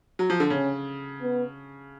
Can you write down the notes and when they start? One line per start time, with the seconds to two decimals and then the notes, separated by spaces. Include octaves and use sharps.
0.19 F#3
0.30 F3
0.40 D3
0.50 C#3 C#4
1.22 B3